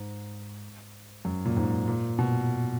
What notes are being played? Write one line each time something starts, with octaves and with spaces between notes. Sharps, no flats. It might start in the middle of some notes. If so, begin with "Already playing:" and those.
Already playing: G#2
F#2
A#2
G#2
A#2
B2